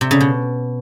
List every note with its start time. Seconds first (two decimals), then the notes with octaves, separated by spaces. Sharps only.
0.01 C3
0.11 C#3
0.21 B2